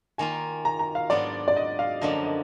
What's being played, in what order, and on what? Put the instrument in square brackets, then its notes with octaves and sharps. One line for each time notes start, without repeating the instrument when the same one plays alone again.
[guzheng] D#3 A#3 F4 [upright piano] G#5
[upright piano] A#5
A#5
F5
[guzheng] G#2 F#3 B3 D4 F4 [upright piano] D5
[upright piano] D5
D#5
F5
[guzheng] F#2 D3 F3 A#3 D4 [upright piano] D#5
[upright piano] D#5